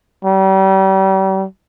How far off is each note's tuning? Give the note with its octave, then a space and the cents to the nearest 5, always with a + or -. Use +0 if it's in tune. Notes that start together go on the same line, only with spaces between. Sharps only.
G3 -35